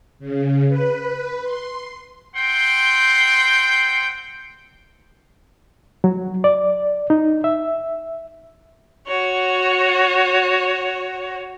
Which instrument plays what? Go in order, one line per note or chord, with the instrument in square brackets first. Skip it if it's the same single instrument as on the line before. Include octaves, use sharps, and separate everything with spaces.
[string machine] C#3
B4
C6
[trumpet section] C4 F#5 G5 C6
[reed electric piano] F#3
D5
D#4
E5
[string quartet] F#4 C#5